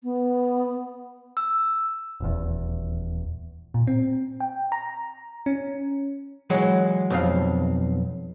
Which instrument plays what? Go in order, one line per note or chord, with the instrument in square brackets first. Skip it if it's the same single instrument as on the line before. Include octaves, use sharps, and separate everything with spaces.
[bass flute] B3
[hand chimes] E6
[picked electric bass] D#1 E2
[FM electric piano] A#2
C4
G5
A#5
C#4
[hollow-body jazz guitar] E3 F#3 G#3
B1 F2 F5